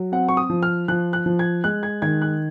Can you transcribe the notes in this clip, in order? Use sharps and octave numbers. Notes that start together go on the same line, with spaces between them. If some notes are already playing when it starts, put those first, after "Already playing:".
Already playing: F#3
C4 F#5
C#6
D#6
F3
F6
F3 F#6
F#6
F3
G#6
G#3 F#6
G#6
D#3 G#6
F#6